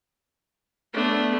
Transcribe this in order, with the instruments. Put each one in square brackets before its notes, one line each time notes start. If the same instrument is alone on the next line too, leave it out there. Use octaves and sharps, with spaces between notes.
[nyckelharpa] A3 D4 [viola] B3